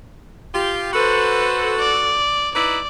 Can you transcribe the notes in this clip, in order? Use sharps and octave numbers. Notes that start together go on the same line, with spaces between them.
F4 G4
F#4 A4 B4 C5
D5
D#4 E4 B4 D5